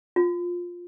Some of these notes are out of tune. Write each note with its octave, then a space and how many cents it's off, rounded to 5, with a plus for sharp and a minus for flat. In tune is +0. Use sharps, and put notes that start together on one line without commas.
F4 +10